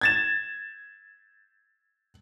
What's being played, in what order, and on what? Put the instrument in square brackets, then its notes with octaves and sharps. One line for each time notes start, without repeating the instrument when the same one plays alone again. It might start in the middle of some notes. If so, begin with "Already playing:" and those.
[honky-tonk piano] G#6 A6 E7